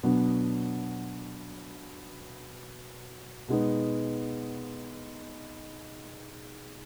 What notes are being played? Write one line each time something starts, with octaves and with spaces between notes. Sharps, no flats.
B2 F#3 B3 D4
B2 G#3 B3 D#4